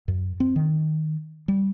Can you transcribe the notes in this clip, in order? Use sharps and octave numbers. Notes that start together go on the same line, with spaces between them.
F#2
C4
D#3
G3